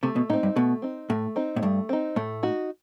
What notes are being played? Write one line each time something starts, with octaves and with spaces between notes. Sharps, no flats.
C3 A3
B2
A2 C4 D#4
G2
B2 A3
C4 D#4
A2 A3
C4 D#4
A2
G2 A3
C4 D#4
A2 A3
D#4 F#4